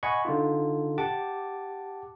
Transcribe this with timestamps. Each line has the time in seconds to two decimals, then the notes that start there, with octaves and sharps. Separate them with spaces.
0.03 D#5 F#5 G#5 B5 C#6
0.25 D3 D#4 F4
0.98 G4 F#5 A5 D6